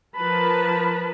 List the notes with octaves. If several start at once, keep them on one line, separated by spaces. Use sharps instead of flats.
F3 A#4 B4 A5 B5